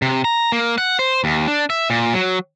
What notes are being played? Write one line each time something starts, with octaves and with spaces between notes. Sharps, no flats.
C3
A#5
A#3
F#5
C5
D#2
D4
E5
A#2
F#3